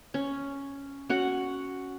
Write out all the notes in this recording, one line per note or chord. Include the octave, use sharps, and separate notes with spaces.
C#4
C#4 F#4 F#5